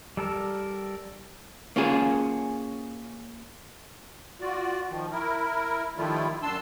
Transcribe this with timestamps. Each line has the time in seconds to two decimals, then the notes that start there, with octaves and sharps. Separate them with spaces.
0.17 G3 A4 A#4
1.76 A#3 C#4 F4 G#4
4.41 F4 F#4 D5
4.89 D#3 F3
5.11 E4 A#4
5.97 D#3 F3 G3 A3 E4 F4
6.42 F#2 D4 A5 C6 E6